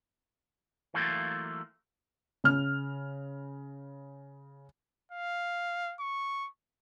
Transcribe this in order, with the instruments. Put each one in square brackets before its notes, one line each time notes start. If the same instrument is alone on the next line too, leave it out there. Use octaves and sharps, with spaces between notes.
[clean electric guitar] E3 F#3 A3 A#3 F4
[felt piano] C#3 F6
[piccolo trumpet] F5
C#6